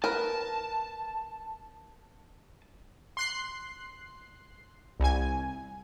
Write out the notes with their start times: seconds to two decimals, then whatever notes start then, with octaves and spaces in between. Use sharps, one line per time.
0.04 A#4 B4 A5
3.17 C6 F#6 C7
5.00 C2 G#5